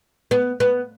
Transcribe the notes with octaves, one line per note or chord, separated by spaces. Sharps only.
B3
B3